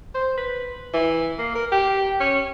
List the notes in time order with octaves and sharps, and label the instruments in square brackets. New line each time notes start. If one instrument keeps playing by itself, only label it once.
[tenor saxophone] C5
B4
E3
A#3
A#4
G4
C#4